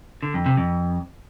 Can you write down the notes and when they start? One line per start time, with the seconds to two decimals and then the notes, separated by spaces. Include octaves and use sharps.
0.23 D3
0.34 F2
0.46 C3
0.57 F2